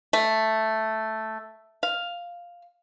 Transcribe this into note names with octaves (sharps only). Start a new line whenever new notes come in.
A3
F5